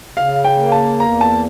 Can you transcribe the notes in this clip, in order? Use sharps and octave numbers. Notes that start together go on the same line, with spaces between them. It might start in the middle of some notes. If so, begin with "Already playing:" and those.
C#3 F5
G5
A#3
A5
E2 A#5
A5